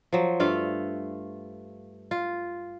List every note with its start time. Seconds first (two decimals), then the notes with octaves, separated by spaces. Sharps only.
0.13 F3 F#3
0.40 G2 A3 F4 F5
2.11 F4